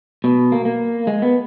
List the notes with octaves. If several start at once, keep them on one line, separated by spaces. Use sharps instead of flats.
B2
A#3
A#3
G#3
B3